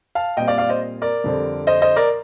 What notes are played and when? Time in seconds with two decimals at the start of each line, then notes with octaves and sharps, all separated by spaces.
0.15 F5 A5
0.37 A#2 G3 C4 D#5 G5
0.47 D5 F5
0.58 D5 F5
0.69 C5 D#5
1.02 A#4 D5
1.24 F2 D3 G3 C4
1.67 C5 D#5
1.82 C5 D#5
1.96 A#4 D5